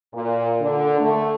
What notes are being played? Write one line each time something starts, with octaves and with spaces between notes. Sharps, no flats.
A#2
D3
A3